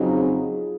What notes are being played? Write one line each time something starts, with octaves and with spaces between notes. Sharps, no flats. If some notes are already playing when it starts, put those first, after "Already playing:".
Already playing: F2 C#3 F#3 C4 D#4 F4 G#4